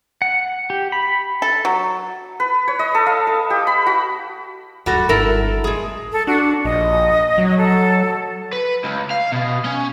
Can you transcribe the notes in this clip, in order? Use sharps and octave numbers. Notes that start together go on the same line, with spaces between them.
F#5
G4
B5
A4
F#3
B4
C#5
D#5
A4
F5
A4
G4
B5
F#4
D1 G2 G3 F#4 A4
G1 E4 A4 A#4
A1 G2 G#3 G#4
A4
D4 F#4
A#1 D#5
F#3
A4
B4
C#2
F5
B2
C#4